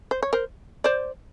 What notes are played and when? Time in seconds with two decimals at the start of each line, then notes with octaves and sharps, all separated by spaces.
0.11 C5
0.23 C#5
0.33 A#4 C5
0.84 C5 D5